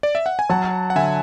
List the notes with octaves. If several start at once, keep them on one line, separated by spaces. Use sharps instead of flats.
D5
E5
F#5
G#5
F#3 F#5 A5
F#5
D3 E5 G#5